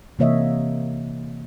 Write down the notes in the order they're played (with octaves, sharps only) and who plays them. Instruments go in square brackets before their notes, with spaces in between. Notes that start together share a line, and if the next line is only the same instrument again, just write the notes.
[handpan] C3 E3 A#3 C#5 D#5 E5